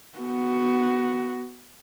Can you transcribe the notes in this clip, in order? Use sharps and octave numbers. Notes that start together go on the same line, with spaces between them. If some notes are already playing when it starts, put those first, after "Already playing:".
B3 F#4